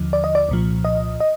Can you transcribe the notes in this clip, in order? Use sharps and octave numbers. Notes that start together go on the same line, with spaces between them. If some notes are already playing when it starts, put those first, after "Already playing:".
Already playing: D#2 D3 F3
D5
D#5
D5
C2 A#2 F3
D#5
D#5